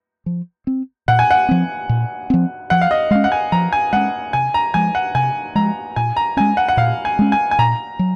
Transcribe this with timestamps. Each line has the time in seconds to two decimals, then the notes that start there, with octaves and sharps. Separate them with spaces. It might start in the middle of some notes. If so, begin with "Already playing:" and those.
0.26 F3
0.67 C4
1.08 A#2 F#5
1.19 G#5
1.31 F#5
1.49 F3 C4
1.89 A#2
2.30 F3 C4
2.70 F3 F#5
2.81 F5
2.91 D#5
3.11 G#3 C#4 F5
3.24 F#5
3.32 G#5
3.52 F3 A#5
3.73 G#5
3.93 G#3 C#4 F#5
4.33 C3 G#5
4.54 A#5
4.74 F3 G#3 G#5
4.95 F#5
5.15 C3 G#5
5.55 F3 G#3 A#5
5.96 A#2 G#5
6.17 A#5
6.37 G#3 C#4 G#5
6.57 F#5
6.68 F#5
6.77 A#2 F5
7.05 G#5
7.19 G#3 C#4
7.32 G#5
7.51 G#5
7.59 A#2 A#5
7.99 F#3